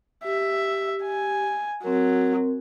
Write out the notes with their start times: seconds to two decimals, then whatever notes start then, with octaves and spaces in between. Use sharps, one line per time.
0.24 G4 E5
1.03 G#5
1.84 F#3 C4 A#4